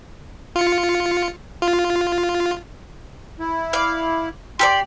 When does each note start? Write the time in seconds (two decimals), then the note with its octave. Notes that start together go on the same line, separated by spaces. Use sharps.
0.56 F4 C#7
1.62 F4
3.40 E4
3.73 D5 F5
4.59 G4 A4 D5 C6